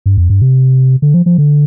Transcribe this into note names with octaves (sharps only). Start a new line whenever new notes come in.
G2
F2
G2
C3
D3
F3
F3
D3